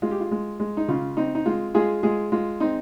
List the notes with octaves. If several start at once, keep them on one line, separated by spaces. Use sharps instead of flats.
G#3 F4
G4
F4
G#3
G#3
D#4
C#3 F4
C4 D#4
D#4
G#3 F4
G#3 F4 G#4
G#3 F4 G#4
G#3 F4
C4 D#4